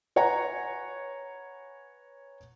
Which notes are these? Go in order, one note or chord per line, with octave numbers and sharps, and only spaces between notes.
B4 C#5 F#5 G#5 A#5